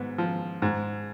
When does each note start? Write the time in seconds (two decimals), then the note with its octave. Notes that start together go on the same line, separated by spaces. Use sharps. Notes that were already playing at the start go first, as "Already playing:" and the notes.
Already playing: G#2 B3
0.18 F3
0.62 G#2